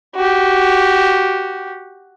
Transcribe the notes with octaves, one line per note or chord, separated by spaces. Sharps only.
F#4 G4